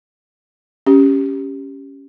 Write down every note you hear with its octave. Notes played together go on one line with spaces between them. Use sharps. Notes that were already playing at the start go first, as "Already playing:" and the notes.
C#4 G4